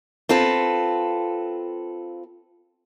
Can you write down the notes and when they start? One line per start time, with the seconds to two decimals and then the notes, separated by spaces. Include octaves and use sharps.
0.29 C4 F4 A4 B4